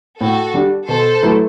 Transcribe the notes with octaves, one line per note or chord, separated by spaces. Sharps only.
A2 F#4 A4
G3 D4 G4
B2 A4 C5
F#3 A3 E4 B4